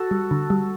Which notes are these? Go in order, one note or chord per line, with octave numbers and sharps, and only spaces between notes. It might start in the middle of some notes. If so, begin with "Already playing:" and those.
Already playing: F#4 A4
G3
D3
G3